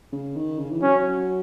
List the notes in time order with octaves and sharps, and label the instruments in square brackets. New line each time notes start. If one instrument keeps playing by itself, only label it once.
[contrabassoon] C#3
D#3
C#3
E3
[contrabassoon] F#3 [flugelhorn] C#4